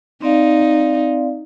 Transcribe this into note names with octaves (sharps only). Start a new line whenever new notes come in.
C4 D#4 D5 F5